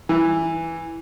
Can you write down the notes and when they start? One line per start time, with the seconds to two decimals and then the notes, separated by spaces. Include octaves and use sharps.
0.09 E3